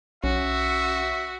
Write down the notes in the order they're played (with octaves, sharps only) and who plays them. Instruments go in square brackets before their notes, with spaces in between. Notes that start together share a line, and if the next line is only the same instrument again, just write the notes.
[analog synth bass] B1 [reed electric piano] C#4 [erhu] F#4 [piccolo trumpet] E5